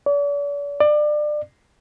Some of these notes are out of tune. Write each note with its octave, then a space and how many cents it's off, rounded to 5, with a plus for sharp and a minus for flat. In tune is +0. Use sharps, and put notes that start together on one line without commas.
D5 -45
D5 +25